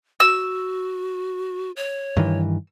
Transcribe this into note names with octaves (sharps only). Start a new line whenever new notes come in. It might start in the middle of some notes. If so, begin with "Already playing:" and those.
F#4 E6
C#5
G2 D#3 E3